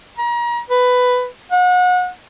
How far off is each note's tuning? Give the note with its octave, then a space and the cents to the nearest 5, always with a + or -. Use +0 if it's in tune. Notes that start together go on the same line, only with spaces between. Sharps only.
A#5 +35
B4 +10
F#5 -35